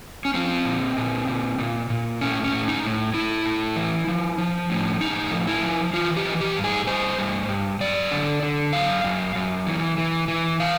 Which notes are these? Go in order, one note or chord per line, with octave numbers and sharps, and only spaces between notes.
C#4
F3 C4
A#2
A#2
A#2
A#2
A#2
A2 C#4
C#4
A2
D#4
A2
A2 E4
A2
E3
F3
F3
A2
A2 D#4
F3
E4
F3
E3 F4
G4
E3
G4
G2
G#4
G2 C5
G2
G2
F#2 D5
D3
D3
F#2 F5
F#2
F#2
E3
E3
E3
E3 F5